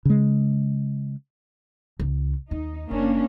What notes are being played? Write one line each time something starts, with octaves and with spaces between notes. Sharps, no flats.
C#3 G#3
C#2
D#2 D#4
F#1 A#3 C#4 D4